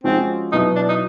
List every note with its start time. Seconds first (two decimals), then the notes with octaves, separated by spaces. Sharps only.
0.04 F3 G#3 C4 C#4 F#4
0.52 B2 F#3 B3 D#4 E4
0.76 D4
0.89 D#4